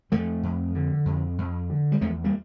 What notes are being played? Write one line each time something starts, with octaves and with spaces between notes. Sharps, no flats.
F2 F3 A3
F2
D3
F2
F2
D3
G3
E2 F3 A3
G3 A#3